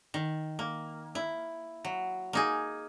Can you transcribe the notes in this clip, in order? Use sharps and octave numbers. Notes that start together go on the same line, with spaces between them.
D#3
A#3
E4
F#3
A#3 D#4 G#4